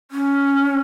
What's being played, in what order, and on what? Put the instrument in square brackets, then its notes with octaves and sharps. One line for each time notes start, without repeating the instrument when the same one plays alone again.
[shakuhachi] C#4